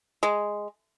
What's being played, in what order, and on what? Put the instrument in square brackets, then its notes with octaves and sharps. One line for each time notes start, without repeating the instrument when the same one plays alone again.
[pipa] G#3